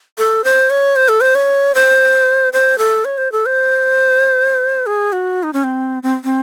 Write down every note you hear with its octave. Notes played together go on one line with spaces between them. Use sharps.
A4
C5
C#5
C5
A4
C5
C#5
C5
C5
A4
C#5
C5
A4
C5
G#4
F#4
D#4
C#4
C4
C4
C4